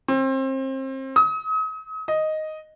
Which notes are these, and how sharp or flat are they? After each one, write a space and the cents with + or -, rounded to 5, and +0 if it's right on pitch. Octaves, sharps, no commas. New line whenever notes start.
C4 +30
D#6 +40
D#5 +0